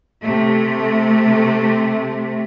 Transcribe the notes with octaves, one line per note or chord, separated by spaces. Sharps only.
C3 A3